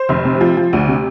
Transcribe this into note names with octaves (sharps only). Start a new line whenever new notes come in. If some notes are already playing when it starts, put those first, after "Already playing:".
Already playing: C5
F1
C3
F3
F3
D2
C3